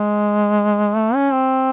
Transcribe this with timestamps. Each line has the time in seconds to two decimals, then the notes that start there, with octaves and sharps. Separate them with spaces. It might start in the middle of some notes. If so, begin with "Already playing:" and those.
Already playing: G#3
0.96 A3
1.14 C#4
1.32 C4